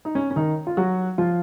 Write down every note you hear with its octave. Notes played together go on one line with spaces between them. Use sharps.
D#4
C#4
C#4
D#3 D#4
F4
F#3 F#4
F3 F4